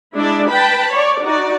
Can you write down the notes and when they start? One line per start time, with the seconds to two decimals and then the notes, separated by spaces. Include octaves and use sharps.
0.16 G#3 D4 E4 D5
0.49 B4 G5 A5 B5
0.91 C#5 D5
1.23 D#4 F#4 D5